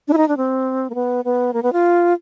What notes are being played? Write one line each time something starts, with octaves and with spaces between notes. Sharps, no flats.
D4
E4
D#4
D4
C4
A#3
B3
B3
A#3
B3
F4